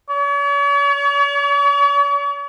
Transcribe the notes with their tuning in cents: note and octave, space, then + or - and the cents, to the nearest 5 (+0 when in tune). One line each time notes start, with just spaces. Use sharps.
C#5 +45